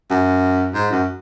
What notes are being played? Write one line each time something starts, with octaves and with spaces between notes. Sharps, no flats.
F#2
G#2
F#2